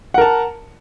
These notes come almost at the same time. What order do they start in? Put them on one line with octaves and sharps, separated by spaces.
F#5 A#4 A5